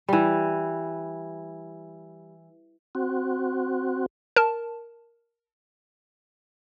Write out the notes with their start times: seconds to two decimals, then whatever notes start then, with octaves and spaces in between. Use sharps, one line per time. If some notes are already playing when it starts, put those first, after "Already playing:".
0.09 E3 G3
2.95 C4 F#4
4.36 A#4 A5